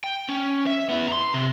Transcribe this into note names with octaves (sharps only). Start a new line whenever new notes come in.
G5
C#4
E5
B3 E4
A#5 C6
C3